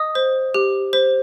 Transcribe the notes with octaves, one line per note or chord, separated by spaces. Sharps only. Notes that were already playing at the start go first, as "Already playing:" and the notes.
Already playing: D#5 D#6
C5
G4
C5